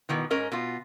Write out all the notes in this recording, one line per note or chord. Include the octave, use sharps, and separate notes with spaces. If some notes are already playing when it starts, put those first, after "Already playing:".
B2 D#3 E3
G#2 C#4 A#4 D#5
B2 F4